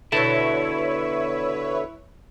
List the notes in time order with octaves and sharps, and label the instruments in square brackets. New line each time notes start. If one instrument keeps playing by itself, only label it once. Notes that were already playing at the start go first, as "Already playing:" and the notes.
[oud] B2 D3 [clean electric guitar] E4 A5 [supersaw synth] B4 C#5 E5